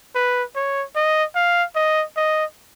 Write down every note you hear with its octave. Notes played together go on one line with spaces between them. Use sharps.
B4
C#5
D#5
F5
D#5
D#5